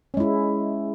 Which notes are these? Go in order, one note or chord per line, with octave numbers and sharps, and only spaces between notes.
G#3 C#4 E4